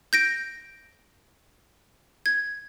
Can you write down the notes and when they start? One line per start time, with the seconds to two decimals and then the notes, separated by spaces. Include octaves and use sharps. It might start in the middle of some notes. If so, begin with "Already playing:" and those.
0.13 G6 A#6 D7
2.26 G#6